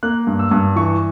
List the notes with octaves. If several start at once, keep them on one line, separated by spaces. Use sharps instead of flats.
A#3 F#6
G2
E6
G2
E3 C#6